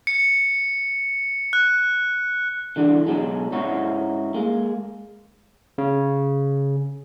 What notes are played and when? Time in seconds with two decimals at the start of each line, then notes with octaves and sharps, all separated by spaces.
0.07 C#7
1.53 F#6
2.76 D3 E3 D4 F#4
3.06 B2 F#3 G#3
3.52 G#2 C#4 D#4 E4 F#4
4.34 G#3 A#3
5.78 C#3